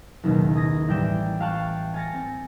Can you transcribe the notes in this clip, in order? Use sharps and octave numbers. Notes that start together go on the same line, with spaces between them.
F#1 D#2 B2 D#3
D#6 G#6 A#6
A1 G3 G5 D6 E7
F5 G5 A5 C#6 F#6
G#5 F6 A6 A#6 C#7
C4